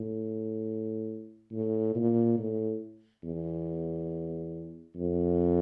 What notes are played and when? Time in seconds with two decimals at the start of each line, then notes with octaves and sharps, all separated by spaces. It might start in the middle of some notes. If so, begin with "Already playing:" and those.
Already playing: A2
1.52 A2
1.96 A#2
2.39 A2
3.24 E2
4.97 F2